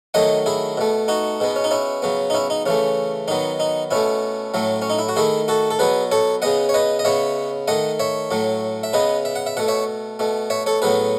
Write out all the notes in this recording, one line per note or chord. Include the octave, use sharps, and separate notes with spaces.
D#3 F#3 A3 D#5 F#5
E4 G#4
B2 A3
D#4 F#4
B2 G#3 B3
C#4
D#4
C#4 E4
C#3 F#3 B3
D#4
C#4 E4
D#4
C#3 E3 A3 C#4
D#3 F#3 B3 D#4
D#4
B2 A3 C#4 E4
A2 F#3 A3
C#4
D#4
E4
F#4
D#3 A3 E4 G#4
F#4 A4
A4
B2 F#3 B3 G#4 B4
A4 C#5
C#3 G#3 B3 D#5 F#5
C#5
B4 D#5
D#5
C#3 G#3 B3 C#5 E5
D#3 A3 D#5 F#5
C#5 E5
A2 F#3 A3
E5
C#3 G#3 B3 B4 D#5
E5
F#5
E5
B2 A3 F#5
C#5 E5
B2 A3
C#5 E5
A4 C#5
A2 F#3 B3 G#4 B4